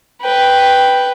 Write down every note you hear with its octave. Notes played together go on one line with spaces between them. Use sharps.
B4 G5